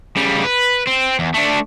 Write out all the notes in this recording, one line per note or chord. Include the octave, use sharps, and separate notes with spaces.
C#3 G3
B4
C4
E2
A3 D4